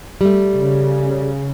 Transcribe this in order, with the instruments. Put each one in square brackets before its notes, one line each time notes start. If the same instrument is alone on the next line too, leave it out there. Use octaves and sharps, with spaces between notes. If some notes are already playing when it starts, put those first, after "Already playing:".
[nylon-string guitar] G3 A3
[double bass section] C#3